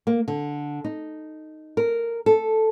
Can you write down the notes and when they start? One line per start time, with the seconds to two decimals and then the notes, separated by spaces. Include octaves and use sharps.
0.07 A#3
0.28 D3
0.85 D#4
1.77 A#4
2.26 A4